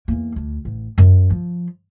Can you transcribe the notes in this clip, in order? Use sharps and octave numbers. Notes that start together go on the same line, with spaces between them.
E2 A#3
D2
A1
F#2
F3